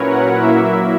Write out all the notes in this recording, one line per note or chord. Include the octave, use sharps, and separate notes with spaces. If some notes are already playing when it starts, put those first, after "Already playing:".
Already playing: A#2 F#3 C#4 E4 A#4 B4 C#5
F#5
F#3 A#3 E4 E5